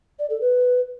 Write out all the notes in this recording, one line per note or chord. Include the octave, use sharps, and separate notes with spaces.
D5
A4
B4